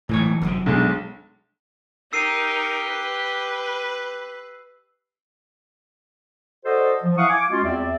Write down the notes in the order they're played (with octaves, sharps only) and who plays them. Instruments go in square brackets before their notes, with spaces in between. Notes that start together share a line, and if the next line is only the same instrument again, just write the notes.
[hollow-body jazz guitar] B1 E3 C#5 [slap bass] A2 G#3
[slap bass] G1 C3 [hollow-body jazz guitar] C#2 F#2
[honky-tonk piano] B1 G#3 [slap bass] B2 D4
[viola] D#4 A#4 [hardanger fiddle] G4 [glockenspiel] E6 C7 D#7
[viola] B4
[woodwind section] F#4 A4 C5 D5 D#5
F3
E4 F5 F#5 C#6 D#6
G#5 D6
G#3 C#4 F4 F#4
E2 C4 D5 E5